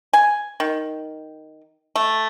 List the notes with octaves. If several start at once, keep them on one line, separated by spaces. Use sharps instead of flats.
G#5
D#3
A3